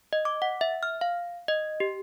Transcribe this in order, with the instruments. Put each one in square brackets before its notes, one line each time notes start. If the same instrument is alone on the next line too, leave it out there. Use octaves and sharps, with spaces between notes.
[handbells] D#5
D6
F#5
E5
F6
F5
D#5
G4